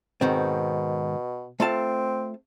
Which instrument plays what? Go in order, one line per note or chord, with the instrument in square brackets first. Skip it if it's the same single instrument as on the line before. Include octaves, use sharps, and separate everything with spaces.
[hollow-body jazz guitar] G#2 D#3 C4 [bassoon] B2
[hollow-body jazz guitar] A3 F4 A5 [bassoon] C4